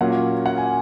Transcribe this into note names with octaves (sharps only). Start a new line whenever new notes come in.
A#2 F#3 A#3 C#4 F#5
F#5
G#5